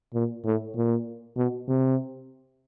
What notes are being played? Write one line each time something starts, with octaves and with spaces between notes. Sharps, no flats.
A#2
A2
A#2
B2
C3